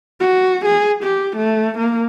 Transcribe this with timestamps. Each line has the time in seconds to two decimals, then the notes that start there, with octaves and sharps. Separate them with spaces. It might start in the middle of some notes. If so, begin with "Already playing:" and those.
0.20 F#4
0.65 G#4
1.03 G4
1.37 A3
1.78 A#3